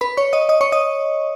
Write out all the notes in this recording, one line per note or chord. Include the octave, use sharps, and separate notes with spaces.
B4 B5
C#5 C#6
D#5 D#6
D#5 D#6
C#5 C#6
D#5 D#6